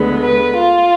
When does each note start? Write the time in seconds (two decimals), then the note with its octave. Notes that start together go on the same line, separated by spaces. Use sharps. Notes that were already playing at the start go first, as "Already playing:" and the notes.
Already playing: D2 D3 G#3 B3
0.22 B4
0.57 F4